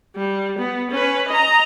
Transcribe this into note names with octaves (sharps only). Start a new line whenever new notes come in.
G3
B3
C#4 B4
D#5 A#5